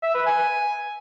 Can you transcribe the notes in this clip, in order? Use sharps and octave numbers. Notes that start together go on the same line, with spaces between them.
E5
B4
G#5